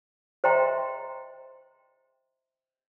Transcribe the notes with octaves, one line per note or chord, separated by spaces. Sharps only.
C5 D#5 E5 G5 A#5 C6